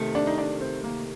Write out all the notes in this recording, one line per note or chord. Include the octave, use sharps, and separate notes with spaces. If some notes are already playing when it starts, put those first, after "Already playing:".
Already playing: C3 D#3 A3
D4
D#4
D4
C4
A#3